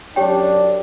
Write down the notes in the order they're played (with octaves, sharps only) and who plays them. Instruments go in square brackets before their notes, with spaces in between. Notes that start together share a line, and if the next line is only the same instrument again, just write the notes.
[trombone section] F#2 D4 [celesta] G4 C#5 G5